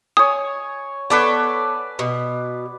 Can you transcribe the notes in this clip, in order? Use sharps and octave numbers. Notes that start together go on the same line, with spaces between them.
C#5 G#5 D#6
B3 A4 B4 C#5 D5
B2